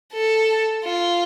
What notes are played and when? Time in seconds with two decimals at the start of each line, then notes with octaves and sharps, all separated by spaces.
0.13 A4
0.85 F4